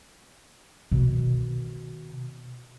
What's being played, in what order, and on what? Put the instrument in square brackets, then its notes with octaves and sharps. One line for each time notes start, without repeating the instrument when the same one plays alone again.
[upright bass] B2 D#3